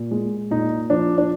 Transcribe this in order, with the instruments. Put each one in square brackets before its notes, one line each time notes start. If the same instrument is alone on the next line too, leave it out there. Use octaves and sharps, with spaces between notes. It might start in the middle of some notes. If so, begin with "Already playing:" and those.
Already playing: [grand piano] A#2
G#3
A#2 D#4
F3 D4
D4